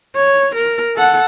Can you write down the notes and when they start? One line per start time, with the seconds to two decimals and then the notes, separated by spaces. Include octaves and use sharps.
0.16 C#5
0.55 A#4
0.96 A4 F#5